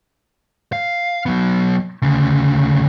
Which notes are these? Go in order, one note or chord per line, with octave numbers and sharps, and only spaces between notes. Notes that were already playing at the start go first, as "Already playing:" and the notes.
F5
F#3 B3
D2 C#3